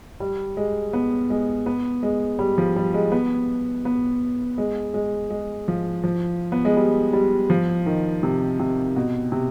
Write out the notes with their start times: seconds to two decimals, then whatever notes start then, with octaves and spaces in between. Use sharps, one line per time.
0.20 G3
0.57 G#3
0.93 B3
1.30 G#3
1.66 B3
2.03 G#3
2.39 G3
2.58 F3
2.76 G3
2.94 G#3
3.12 B3
3.85 B3
4.58 G#3
4.94 G#3
5.30 G#3
5.68 F3
6.04 F3
6.52 B3
6.65 G#3
6.77 G3
7.13 G3
7.50 F3
7.86 D#3
8.23 C3
8.59 C3
8.96 B2
9.32 C3